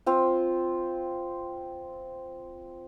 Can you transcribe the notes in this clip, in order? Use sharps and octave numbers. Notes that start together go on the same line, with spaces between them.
C4 F4